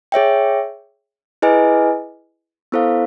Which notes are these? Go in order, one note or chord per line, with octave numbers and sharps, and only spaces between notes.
G#4 C#5 E5 G5
E4 G#4 B4 D#5 G#5
B3 E4 A4 C5 F5